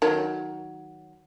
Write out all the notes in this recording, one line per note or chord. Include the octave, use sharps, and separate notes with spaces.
D#3 F#3